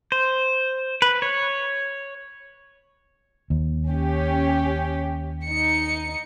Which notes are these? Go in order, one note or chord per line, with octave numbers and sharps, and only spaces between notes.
C5
B4
C#5
D#2
C#4 G4
D#4 C#7